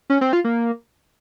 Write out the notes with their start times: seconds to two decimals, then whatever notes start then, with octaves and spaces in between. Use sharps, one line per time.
0.10 C#4
0.21 C4
0.33 F4
0.44 A#3